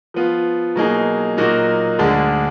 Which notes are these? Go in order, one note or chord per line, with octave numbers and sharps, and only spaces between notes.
F3 B3 F4
B2 F#3 A#3 D#4 G#4
A#2 F#3 A#3 D#4 F#4
D2 D3 G#3 D4